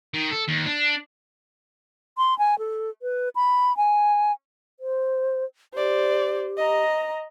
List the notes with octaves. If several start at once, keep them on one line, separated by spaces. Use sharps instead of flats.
D#3
A4
D#2
D4
C6
G#5
A4
B4
B5
G#5
C5
G4 C5 D5
D#5 A#5